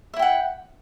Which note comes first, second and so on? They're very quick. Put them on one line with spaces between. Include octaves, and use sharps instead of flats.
E5 E4 G5 F#5